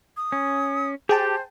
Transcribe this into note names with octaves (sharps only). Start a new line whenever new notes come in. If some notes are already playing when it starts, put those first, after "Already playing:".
D#6
C#4
G4 G#4 C5 G5 A5